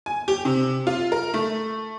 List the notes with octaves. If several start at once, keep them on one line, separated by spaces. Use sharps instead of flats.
G#5
G4
C3
F4
A#4
A3